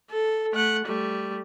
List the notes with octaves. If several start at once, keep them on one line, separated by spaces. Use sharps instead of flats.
A4
A3 F#5
G3 A3